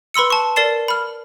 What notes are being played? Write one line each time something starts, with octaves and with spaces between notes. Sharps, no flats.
B4 B5 C6 E6 C#7
A5 C#6
A#4 D5 A6 C7 E7
B5 F6